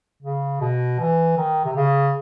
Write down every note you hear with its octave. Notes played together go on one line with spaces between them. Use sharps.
C#3
B2
E3
D#3
C3
C#3